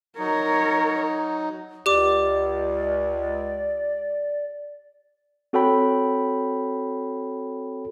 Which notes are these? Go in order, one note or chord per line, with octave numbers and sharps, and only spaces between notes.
F#3 D#4 A#4 C#5
C#2 G4 D5 D6
C4 F#4 A4 C#5 G5 B5